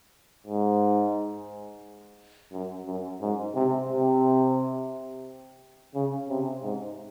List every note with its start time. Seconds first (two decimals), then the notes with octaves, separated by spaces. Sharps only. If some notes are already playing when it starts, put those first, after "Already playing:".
0.47 G#2
2.52 F#2
2.86 F#2
3.21 G#2
3.55 C3
3.89 C3
5.95 C#3
6.29 C3
6.63 G#2